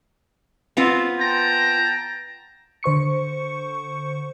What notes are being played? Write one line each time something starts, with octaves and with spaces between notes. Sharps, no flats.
B3 C4 F4
G5 A5 A#5
D3 C5 C#6 C#7